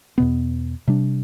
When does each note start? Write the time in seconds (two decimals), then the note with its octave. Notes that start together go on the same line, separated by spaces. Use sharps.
0.18 E2 B2 B3
0.88 C3 G3 D4